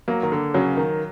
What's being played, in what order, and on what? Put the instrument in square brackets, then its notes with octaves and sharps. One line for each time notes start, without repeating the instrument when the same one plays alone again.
[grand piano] F#3 [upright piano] A#3
[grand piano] D#3
D3
[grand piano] C#3 [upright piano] F#3
[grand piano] D#3